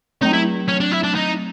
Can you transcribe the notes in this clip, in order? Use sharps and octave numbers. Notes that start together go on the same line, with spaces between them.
F#3 A3 C4 D#4
E4
C#4
D4
E4
D4
D#4